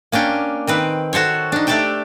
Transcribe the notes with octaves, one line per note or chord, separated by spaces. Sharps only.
A#3 C#4 D4 G5 G#5
D#3 C4 B4
F#4 A4 C5 C#5
D4 D#4
A3 D4 G4 D5 E5 G5